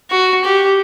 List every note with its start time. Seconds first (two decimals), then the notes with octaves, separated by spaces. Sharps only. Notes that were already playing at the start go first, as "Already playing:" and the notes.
0.11 F#4
0.44 G4